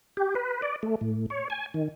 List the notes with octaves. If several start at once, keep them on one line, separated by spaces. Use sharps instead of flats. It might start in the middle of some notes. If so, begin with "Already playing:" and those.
G4
B4
D5
A3
A2
C#5
G#5
D#3